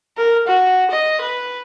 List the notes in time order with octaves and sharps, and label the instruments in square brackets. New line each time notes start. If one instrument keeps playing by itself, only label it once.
[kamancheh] A#4
F#4
D#5
B4